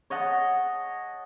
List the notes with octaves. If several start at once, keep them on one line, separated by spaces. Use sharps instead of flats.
C#5 D#5 F#5 A5